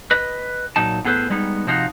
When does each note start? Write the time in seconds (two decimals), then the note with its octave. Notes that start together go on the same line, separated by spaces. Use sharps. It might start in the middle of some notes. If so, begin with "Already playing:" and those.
0.11 B4 D#5
0.76 A#2 F#3 D#4 A5
1.05 A2 B3 G#4 A4 B4 C5
1.30 G3 G#3 B3 D#4
1.67 C3 F3 D#4 F4 F#4